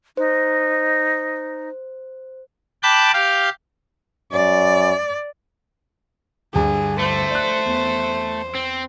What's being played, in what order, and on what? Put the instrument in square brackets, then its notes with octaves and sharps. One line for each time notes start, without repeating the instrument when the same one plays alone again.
[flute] D#4 [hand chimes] C5
[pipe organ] G5 A5 B5 D6 F#6 G6
G4 F5 G5
[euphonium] F#2 [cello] D5
[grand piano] D2 G2 D3 [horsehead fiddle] G#4
[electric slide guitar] A3 [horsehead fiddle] C5
[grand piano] D5 F#6
E2
[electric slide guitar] C4